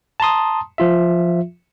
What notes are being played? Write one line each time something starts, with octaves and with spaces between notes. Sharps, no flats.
A5 A#5 C6 D#6
F3 F4 E5